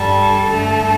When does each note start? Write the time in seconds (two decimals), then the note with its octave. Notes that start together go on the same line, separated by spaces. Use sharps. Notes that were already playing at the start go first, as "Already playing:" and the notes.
Already playing: G2 G3 A4
0.48 G2 D3 A3